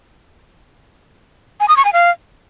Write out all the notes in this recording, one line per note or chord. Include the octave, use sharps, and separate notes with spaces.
G#5
D#6
C#6
G#5
F5